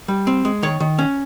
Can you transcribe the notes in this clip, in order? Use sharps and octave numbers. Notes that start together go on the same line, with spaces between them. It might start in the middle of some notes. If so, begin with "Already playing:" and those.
G3
C4
G#3
D#3 C#5
D#3
C#4